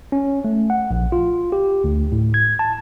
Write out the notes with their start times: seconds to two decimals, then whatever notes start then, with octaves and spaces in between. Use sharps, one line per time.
0.12 C#4
0.45 A3
0.70 F#5
0.91 A#1
1.12 F4
1.52 G4
1.84 D2
2.12 A2
2.34 G#6
2.59 A5